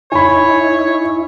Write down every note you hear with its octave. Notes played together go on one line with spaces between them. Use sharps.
D#4 E4 C#5 G#5 B5